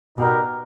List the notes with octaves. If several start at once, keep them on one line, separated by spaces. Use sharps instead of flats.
B2 D#4 G4 A#4 D5 F#5